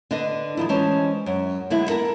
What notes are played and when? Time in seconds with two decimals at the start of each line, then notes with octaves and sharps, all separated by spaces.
0.11 D3 D4 B4 D#5
0.57 D#3 F3 E4
0.69 E3 G#3 C#4 C5 A5
1.26 F#2
1.70 D3 G#3 B3 E4
1.89 E4 A4 A#4